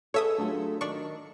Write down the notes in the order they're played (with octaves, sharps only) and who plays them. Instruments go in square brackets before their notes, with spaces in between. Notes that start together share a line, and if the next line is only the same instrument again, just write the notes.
[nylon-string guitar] G#4 A4 [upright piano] B4 D#5 [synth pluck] C#5 E5 D#6
[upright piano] D3 F#3 F4 [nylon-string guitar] A3 G#4
[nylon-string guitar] D#3 [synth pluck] D4 C#6